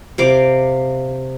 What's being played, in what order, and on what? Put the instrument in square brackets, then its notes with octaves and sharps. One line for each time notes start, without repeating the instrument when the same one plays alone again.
[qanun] C3 F5 D6